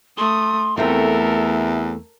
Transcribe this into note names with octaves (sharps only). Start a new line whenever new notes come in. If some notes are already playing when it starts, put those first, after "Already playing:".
A3 C6 D#6
E2 A3 C4 F4 A4 A#4 E5